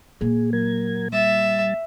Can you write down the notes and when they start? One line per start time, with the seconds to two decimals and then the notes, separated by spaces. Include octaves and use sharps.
0.21 A#2 A#3 G#4
0.53 F#3 A#4 G#6
1.13 G3 E5 A6